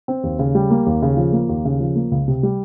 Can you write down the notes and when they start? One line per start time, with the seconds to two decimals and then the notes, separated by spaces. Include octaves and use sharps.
0.08 C4
0.23 D#2
0.39 C#3
0.55 G3
0.70 A#3
0.86 D#2
1.02 C#3
1.17 F3
1.32 A#3
1.49 D#2
1.65 C#3
1.80 F3
1.96 A#3
2.11 C#2
2.28 C3
2.43 G3